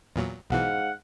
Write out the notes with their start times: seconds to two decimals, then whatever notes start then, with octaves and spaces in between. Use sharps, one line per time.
0.16 E2 A#2 F#3
0.50 B1 G#2 B2 E3 F5 F#5